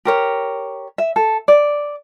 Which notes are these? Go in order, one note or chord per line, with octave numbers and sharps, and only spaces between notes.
G4 A#4 C#5
E5
A4
D5